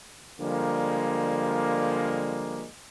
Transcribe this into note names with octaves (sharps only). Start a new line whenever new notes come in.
D3 F3 G3 G#3 A#3